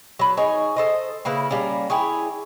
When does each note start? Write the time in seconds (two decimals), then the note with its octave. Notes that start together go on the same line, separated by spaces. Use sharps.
0.19 F#3 B4
0.37 D#4 G#4 C#5
0.76 A4 C5 D#5
1.25 C#3 A#3 E4 B4
1.51 G3 A#3 C#4
1.90 E4 G4 G#4 C#5